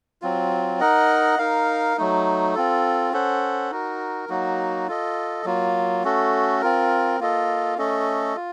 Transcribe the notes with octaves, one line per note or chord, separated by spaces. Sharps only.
F#3 C4 F4
D#4 A#4 D#5 F#5
D#4 A#4 F5
F#3 A3 D#4
C4 F4 A4
C#4 A4 C5 F#5
D#4 F#4 A#4
F#3 A#3 D#4 F#4
F4 A4 D#5
F#3 A#3 F4
A3 C#4 F#4 A4
C4 F4 A#4
A#3 F4 A4 D#5
A3 C#4 A4 D#5
F4